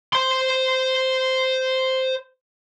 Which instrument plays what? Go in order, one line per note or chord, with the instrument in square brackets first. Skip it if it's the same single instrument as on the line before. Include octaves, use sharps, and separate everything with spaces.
[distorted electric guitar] C5 C6